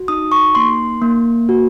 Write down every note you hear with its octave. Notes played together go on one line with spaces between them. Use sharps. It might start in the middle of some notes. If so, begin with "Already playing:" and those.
Already playing: F#4
D#4 D#6
C#6
A#3 C6
A#3
F#4